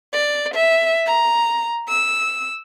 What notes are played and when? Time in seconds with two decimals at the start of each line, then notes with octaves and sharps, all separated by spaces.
0.13 D5
0.54 E5
1.06 A#5
1.88 E6